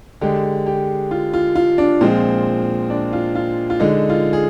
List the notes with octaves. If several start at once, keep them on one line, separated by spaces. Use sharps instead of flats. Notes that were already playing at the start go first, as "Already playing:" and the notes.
D3 G#3 G4
G4
F4
F4
F4
D4
A#2 F3 G#3 C4
D4
F4
F4
F4
D3 G#3 D#4
F4
G#4